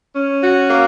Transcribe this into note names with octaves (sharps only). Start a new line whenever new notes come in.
C#4
F#4
A#3